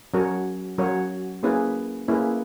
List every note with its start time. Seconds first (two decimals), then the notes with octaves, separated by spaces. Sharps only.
0.14 F#3 C#4 F#4 A#4 C#5
0.78 F#3 C#4 F#4 A#4 C#5
1.43 A#3 C#4 E4 G#4 B4
2.08 A#3 C#4 E4 G#4 B4